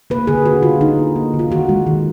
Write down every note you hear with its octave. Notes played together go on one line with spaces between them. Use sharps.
A#3 B4
D3 G#4
D3 F#4
D3 F4
D3 D#4
A#3
A#3
D3
F4
D#3 F#4
G#3
D#3